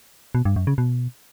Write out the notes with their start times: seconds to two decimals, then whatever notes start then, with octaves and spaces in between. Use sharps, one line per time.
0.35 B2
0.45 G2
0.56 F#2
0.67 C#3
0.78 B2